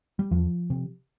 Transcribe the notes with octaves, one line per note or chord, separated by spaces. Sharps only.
G3
E2 F3
C3